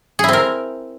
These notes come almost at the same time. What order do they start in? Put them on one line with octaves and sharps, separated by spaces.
G#4 E4 C4 A#4